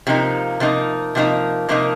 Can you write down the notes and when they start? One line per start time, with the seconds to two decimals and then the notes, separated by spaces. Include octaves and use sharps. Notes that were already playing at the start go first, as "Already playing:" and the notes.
0.07 C3 F3 A#3 D#4
0.60 C3 F3 A#3 D#4
1.15 C3 F3 A#3 D#4
1.69 C3 F3 A#3 D#4